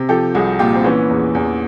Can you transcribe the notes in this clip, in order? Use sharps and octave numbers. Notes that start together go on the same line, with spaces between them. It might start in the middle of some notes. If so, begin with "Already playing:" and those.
Already playing: C3
F3 G4 A4
C2 F#4 G#4
A#2 F4 G4
C4
E3 B3 C#4
E2
E2